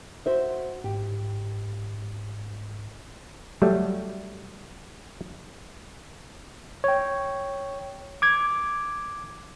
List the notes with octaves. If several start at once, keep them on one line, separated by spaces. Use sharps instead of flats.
F#4 C5 E5
G1 G#2 G4
F#3 G3 A3
C#5 G5
D6 G#6